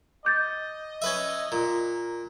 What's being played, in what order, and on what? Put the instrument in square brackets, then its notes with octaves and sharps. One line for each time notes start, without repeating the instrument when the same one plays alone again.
[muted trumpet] D#5 [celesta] D6 G6 A6
[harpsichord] C#4 B4 E5
[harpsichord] A#2 [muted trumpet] A#4